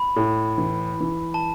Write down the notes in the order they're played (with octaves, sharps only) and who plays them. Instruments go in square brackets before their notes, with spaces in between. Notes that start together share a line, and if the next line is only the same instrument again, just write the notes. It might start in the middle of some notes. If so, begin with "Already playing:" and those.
Already playing: [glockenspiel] B5
[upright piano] A2
E3
E3
[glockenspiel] A5